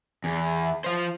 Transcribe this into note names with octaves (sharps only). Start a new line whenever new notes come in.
E2
F3 C5